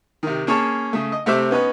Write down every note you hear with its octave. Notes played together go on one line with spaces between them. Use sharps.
C3 D#3
A#3 C#4 G#4 C#5 A5
C#3 A3
D#5
C3 A3 C4 E5 D6
B3 C#4 D#4 B4